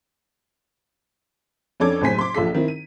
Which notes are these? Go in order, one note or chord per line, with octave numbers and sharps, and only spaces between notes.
F2 C#4 D4 A4 D6 G#6
F#1 A2 C3 C5 G#5 B6
C6 D6
A#1 F4 A4 B6
D#3 C4 E4
D#7